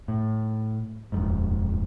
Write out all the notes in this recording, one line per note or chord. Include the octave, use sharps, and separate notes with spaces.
A2
D#1 F2 G#2